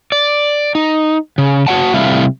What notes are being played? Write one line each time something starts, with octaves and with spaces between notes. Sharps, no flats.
D5
D#4
C#3
F#4 C#5 F#5 A5
C3 G3 A3 E4 F5